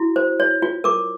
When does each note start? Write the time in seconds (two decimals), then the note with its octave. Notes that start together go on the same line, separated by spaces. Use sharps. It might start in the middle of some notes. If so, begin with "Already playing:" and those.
Already playing: E4 F#4
0.16 C5
0.40 C#5
0.62 F4
0.84 A#4 D6